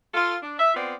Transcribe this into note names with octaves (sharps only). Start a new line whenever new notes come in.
F4 A4
D4
E5
B3 C4 F4 D5